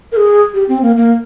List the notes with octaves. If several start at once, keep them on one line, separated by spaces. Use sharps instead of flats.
A#4
G#4
G4
C4
A#3
A#3